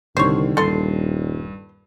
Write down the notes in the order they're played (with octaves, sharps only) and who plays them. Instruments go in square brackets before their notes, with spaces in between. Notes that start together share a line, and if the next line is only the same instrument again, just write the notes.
[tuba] C2 [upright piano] D3 D#3 [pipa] C5 C#5
[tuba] D#1 [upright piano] G2 [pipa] A4 C6